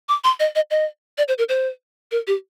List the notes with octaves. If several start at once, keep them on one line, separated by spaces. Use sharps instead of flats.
D6
C6
D#5
D#5
D#5
D5
C5
A#4
C5
A#4
G4